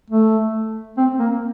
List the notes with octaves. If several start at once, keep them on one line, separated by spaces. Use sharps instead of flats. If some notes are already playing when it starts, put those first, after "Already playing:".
A3
C4
A#3